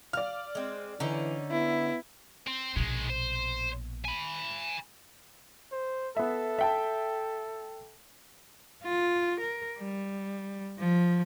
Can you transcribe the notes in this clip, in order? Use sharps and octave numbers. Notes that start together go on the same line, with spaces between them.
D5 F5 F6
G#3 C4
D3 E3 C#4 D#4
B3 E4
C4
A#1 B2 D#3 G#3
C5
G#5 B5
C5
B3 A4 E5
E5 G5 A5
F4
A#4
G3
F3